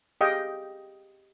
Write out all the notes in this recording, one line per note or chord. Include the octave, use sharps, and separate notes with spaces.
G4 G#4 D#5 F5 G5